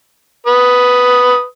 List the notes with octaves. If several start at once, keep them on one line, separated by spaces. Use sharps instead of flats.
B4 D#6